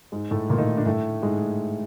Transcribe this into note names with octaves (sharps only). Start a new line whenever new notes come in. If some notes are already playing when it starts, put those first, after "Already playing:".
G#2 G#3
A2 A3
A#2 A#3
D#3 D#4
D3 D4
A2 A3
G#2 G#3